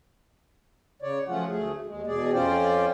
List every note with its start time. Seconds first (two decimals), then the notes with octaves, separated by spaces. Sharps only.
1.02 C#3 C#5 D5
1.28 F3 F#3 A3 C#4 F4 F#5
1.48 D2 A3 G#4
1.87 D#2 G#3
2.07 E2 B2 G#4 D5
2.33 F2 C#4 F4 C5 D5 G5